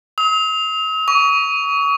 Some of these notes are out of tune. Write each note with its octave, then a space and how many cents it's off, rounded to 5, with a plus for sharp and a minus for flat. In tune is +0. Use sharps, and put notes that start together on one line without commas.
D#6 +45
C#6 +30